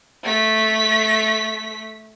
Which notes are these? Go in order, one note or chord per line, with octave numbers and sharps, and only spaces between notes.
A3 B6